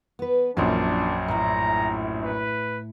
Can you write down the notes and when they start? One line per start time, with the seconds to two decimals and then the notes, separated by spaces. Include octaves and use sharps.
0.19 B3 B4
0.57 A#1 F#2 F3 A#3 D4 D#4
1.28 A2 E4 A#5
2.22 B4